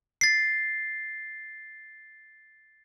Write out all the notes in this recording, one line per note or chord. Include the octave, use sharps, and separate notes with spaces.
A6 C7